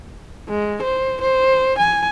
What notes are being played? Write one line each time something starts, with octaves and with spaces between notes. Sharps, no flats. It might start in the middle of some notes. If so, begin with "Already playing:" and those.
G#3
C5
C5
G#5